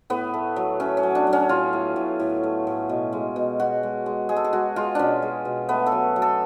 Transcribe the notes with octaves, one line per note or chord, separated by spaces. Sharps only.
A2 B3
A3
F#3
A3 C#4
C#4
F#3
D4
F#3
C#4
A2 F4
A2
A2
A2
A3
A2
B2
G#3
B2
B2 F#4
G#3
G#3
G#3 G#4
A4
G#4
G#3 F#4
G#3 F4
B2 C#4 D4
G#3
B2
A3 B3
A4
F#3
F#3
A4